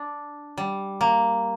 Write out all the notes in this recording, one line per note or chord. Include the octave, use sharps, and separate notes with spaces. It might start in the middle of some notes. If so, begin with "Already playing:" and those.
Already playing: D4
G3
A#3